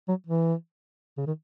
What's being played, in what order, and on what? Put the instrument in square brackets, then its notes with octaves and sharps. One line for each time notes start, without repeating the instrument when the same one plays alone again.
[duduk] F#3
E3
C#3
D#3